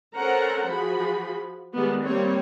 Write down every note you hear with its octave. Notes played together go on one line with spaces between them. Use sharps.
C#4 A4 A#4 C5 F#5 A#5
F3 F#4 G#4 B5
D#3 G3 G#3 B3
G3 A#3 C4 C#5